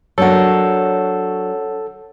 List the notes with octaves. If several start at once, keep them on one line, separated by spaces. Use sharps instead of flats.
F#3 D4 A4 A#4 C#5 F#5